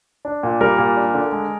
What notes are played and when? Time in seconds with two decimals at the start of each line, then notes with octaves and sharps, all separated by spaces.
0.25 D4
0.43 A#2
0.61 G3 A#4
0.78 A#2
0.97 D4
1.14 D3
1.32 G#3